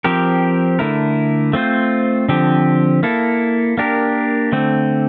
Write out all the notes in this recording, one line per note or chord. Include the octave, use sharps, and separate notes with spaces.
F3 C4 G4 A#4
D3 A3 E4 A#4
A3 C4 F4 C5
D3 F3 C4 G4
A#3 E4 A4
A#3 D4 G4 A#4
D3 A3 C4